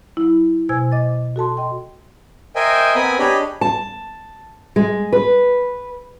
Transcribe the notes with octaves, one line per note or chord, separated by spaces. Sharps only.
F#3 E4
B2 C5 G#5 E6 G#6
C5 D#5 D6 A6
F#4 A4 A5 C6
D#5 G5 C6
A#4 C5 D#5 E5 G5 G#5
B3 C4 A#4 G#5 B5 D#6
D4 G4 G#4 C#5 D#5 B5
A5
G#3
B4